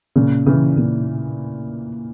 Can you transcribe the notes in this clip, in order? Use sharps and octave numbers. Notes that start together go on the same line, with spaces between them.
A#2 C#3
C#3 E3
A#2 C#3